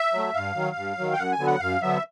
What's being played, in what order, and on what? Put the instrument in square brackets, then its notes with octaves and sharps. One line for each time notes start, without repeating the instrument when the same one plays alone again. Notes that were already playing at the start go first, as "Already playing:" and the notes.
Already playing: [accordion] E5
F#3 A3
G2 F5
D#3 F#3
G2
D#3 F#3
G5
F#2 F#5
G#5
D3 F#3 B3
F#5
F#2 F5
D3 F#3 B3 E5